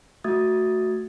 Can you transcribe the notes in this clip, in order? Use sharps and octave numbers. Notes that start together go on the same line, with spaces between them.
A3 F#4 E5 D#6 G#6 A6